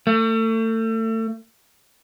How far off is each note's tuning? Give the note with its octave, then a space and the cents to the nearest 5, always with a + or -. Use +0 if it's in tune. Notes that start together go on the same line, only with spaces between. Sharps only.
A3 +30